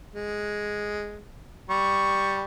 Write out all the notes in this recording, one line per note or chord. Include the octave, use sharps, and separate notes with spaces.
G#3
G3 C#6